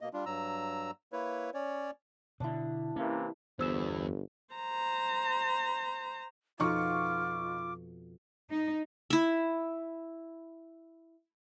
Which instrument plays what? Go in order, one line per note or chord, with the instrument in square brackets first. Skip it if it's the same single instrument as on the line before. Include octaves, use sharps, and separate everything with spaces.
[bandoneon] B2 A#3 D#5
G3 D4 F4
G2 F#3 A#5 E6
A#3 E4 B4 C#5
C#4 C#5 D5
[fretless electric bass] B2 D3 [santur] D4 E4
[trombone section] C3 E3 A#3 [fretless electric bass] C#4
[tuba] G1 [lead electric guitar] E2 [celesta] C5 E6 E7
[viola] C5 A#5
[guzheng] F2 B2 F3 [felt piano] D#4 C#6 [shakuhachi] F4 [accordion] D6
[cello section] D#4
[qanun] E4 E5